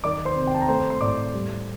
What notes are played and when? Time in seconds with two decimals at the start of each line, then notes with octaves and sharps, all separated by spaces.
0.04 D#3 D5 D6
0.25 C5 C6
0.36 C3
0.47 G5
0.54 A5
0.61 A#5
0.68 A3 C5 C6
0.90 C6
1.01 A2 D5 D6
1.34 G3